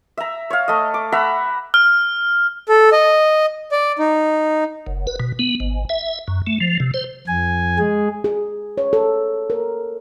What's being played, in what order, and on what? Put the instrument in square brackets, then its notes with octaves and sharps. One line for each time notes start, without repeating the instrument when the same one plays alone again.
[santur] E5 A#5
C#5 F5
A3 D#5
D6
E5 F#5 A#5 B5
[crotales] F6
[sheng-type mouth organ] A4
D#5
D5
D#4
[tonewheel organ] F#1
B4
B2
B3
G#1
E5
F#2
A3
F3
C3
C5
[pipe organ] F2 G#5
G#3 G#4
[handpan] G#4
C#5
A4
A#4